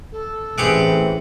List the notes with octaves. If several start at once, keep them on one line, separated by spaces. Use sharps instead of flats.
A4
A1 E3 C4 G4 G#4 F#5